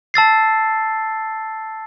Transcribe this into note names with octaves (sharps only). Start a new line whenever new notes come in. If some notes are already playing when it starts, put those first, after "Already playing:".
A5 E6 A6 C7